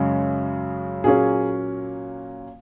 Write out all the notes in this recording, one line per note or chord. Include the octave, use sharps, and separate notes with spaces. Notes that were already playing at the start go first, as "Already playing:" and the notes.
Already playing: F#2 C#3 G#3 C#4
A#2 F#3 A#3 C#4 G#4